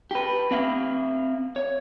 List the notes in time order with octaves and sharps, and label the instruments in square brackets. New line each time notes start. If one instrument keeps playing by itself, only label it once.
[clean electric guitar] G4 B4
C4 E5 F5
C#5